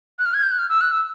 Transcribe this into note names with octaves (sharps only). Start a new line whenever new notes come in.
F#6
F6
G#6
G6
F#6
F6
E6
F#6
E6